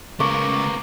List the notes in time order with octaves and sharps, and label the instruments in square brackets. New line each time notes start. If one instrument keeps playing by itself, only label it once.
[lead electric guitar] C#3 G#3 [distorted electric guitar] B3 A#4 [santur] C#6 D6